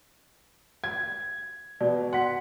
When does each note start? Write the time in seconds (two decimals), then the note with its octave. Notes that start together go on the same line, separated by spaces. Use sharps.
0.84 G#6
1.81 B2 D5
2.13 F#5 C6 B6